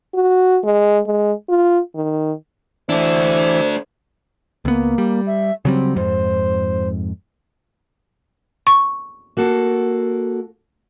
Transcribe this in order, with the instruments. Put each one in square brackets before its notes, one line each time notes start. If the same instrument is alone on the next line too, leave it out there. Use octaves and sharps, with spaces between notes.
[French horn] F#4
G#3
G#3
F4
D#3
[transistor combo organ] E3 [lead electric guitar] A3 D4 [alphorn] C5
[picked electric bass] C#2 B3 [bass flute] A#3
[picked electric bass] G3
[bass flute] E5
[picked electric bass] C#3 F#3 G3 [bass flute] C4
[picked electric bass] F2 G#2 [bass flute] C5
[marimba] C#6
[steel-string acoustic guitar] A#3 F#4 A4